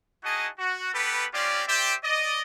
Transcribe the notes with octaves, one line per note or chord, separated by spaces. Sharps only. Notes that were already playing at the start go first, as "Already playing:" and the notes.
D#4 E4 F#4 G#4 D#5 A5
F#4
B3 G4 A4 B4
C4 C#4 F4 G4 D5
G4 C5 D5 E5 G5
D5 D#5